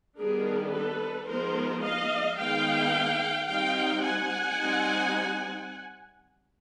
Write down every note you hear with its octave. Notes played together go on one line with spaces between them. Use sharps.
D#3 G3 B3 D4 G#4 A#4
A4 B4
F3 G#3 B3 D#4 A#4 C5
D#5 F5
D#3 G#3 B3 D#4 F5 G5
G3 C4 D#4 F5 G5
F#5 G#5
G3 C4 D#4